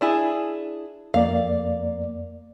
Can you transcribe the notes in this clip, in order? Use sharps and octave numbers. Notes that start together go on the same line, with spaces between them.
D4 E4 G#4
F2 A#3 D5 F5